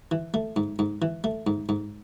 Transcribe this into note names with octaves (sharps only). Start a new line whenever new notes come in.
E3
A3
G#2
G#2
E3
A3
G#2
G#2